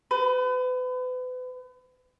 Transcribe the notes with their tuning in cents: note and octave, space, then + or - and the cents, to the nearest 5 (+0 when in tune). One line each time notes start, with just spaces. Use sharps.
B4 +35